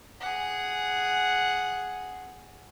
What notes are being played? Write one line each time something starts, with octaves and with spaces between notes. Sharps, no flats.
G#4 F#5